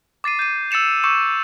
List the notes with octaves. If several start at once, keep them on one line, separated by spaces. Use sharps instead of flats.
D6 A6 C7 D#7
G6 D#7
E6 A6 C#7 E7 F7
C#6 D6 E6 G6 C#7 E7